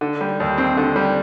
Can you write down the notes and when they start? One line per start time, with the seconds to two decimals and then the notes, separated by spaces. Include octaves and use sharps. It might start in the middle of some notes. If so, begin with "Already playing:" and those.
0.01 D3
0.21 G3
0.40 D#2
0.58 C4
0.77 D3
0.96 G3